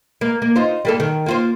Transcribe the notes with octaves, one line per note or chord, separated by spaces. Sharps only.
A#3
A#3
D#4 F4 C5
G3 A#3 A4
D#3
A#3 F4 C5